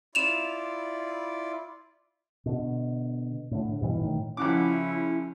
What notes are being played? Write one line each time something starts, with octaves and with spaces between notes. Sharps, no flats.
E4 F4 D5 E7 F7
B2 D3
A2 D3
G2 B2 E3
A2 D#3
F2 C#3 C#4 E4 F#5 D6